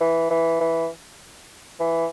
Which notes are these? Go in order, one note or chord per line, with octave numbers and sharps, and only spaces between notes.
E3
E3
E3
E3